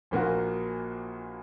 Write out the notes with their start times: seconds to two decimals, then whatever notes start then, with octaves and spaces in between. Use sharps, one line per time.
0.11 A#1 A#2 A#3 F#4